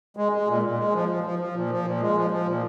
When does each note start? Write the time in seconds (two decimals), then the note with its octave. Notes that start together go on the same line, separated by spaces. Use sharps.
0.17 G#3
0.32 G#3
0.48 A#2
0.62 A#2
0.78 G#3
0.93 F3
1.09 F3
1.24 F3
1.39 F3
1.54 A#2
1.70 F3
1.85 A#2
2.00 G#3
2.15 F3
2.31 F3
2.46 A#2